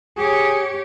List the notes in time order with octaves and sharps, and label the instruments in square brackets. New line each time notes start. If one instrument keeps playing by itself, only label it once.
[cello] G4 C#5 [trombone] G#4